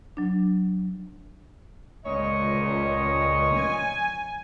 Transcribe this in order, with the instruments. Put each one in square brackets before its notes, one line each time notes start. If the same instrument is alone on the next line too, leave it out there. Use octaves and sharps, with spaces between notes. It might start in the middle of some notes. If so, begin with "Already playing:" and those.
[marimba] F#3 D4
[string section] C#2 [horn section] A#2 C#5 D#5
[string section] G#5